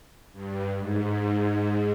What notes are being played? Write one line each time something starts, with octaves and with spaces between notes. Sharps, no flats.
G2
G#2